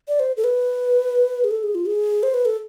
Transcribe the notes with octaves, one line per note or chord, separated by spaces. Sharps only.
D5
C5
A4
B4
G#4
A4
G#4
F4
G#4
C5
B4
A4